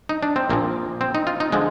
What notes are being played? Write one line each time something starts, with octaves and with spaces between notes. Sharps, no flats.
D#4
D4
C4
A#1 A#2 F3 A#3
C4
D#4
F4
D#4
D3 F3 G#3